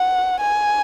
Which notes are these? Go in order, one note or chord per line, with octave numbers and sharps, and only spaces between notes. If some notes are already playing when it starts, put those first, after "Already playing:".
Already playing: F#5
G#5